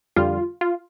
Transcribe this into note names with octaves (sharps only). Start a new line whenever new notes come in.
F2 D3 G3 F4
F4